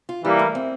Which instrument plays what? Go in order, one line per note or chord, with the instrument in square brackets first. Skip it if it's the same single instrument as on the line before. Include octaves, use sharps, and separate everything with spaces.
[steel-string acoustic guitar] F4
[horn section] E3 G3 A#3 [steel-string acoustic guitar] E4
[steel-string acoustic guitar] A3
C4